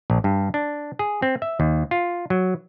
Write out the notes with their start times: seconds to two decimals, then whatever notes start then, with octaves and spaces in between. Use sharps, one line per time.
0.10 A#1
0.24 G2
0.54 D4
0.99 G#4
1.22 C4
1.42 E5
1.60 D#2
1.91 F4
2.30 F#3